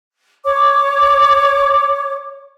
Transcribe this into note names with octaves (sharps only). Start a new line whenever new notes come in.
C#5 D6